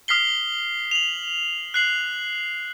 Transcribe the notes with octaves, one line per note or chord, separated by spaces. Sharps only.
D#6 F6 B6 C7 G7
F7 F#7
F#6 C7 F#7